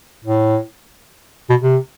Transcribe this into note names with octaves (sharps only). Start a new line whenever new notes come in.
A2
B2
C3